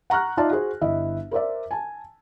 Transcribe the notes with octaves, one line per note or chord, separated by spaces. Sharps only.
F#5 A#5 C#6 F6 F#6
D#4 F4 D5 E5 A5
F#4 G#4 C5
G1 E4 D#5 E5
A#4 C5 D5 E5
G#5 A5